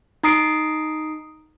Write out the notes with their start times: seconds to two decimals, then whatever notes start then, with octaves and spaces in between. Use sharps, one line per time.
0.23 D#4 A#5 D#6 C7 D7